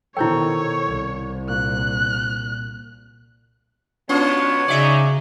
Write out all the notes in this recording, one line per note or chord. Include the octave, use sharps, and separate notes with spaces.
B2 D#3 E4 A4 C5 C#5 G5 G6
C2
A#2 A#3 F#6
B2 F#3 B3 C#4 F4 C#5
C#3 F#3 C#4 D#4 D5 E5